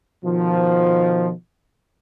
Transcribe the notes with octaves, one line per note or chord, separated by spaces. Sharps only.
B2 D#3 F3